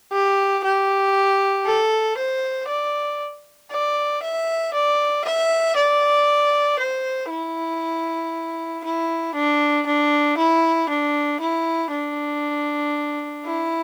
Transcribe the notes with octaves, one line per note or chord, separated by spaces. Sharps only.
G4
G4
A4
C5
D5
D5
E5
D5
E5
D5
C5
E4
E4
D4
D4
E4
D4
E4
D4
E4